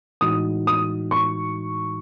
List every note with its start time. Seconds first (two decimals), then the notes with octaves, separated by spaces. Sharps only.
0.21 A2 E3 G#3 D#4 F#4 D#6
0.67 D#6
1.11 C#6